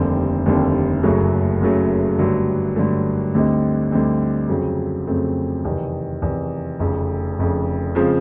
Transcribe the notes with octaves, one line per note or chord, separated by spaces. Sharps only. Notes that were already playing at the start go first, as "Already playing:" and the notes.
Already playing: F1 D#2 D3 G3 C4
F1 D#2 D3 G3 C4
F#1 F#2 C#3 F#3 A3
F#1 F#2 C#3 F#3 A3
G2 D3 F#3 A3
G2 D3 F#3 A3
D2 D3 G3 C4 D#4
D2 D3 G3 C4 D#4
F2 C#3 F#3 A3 C4
F2 C#3 F#3 A3 C4
E2 C3 D#3
E2 C3 D#3
F1 F2 C#3
F1 F2 C#3
C#3 F3 G#3 C4